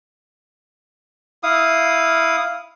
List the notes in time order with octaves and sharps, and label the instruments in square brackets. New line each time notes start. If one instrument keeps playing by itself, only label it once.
[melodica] E4 F5 D#6